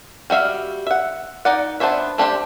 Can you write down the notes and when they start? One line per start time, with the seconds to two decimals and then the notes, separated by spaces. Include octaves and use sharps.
0.30 G3 F#4 E5 F5
0.87 E5 F#5
1.45 D#4 D5 F#5
1.80 B3 D4 C5 C#5 E5
2.18 A3 D4 G4 C5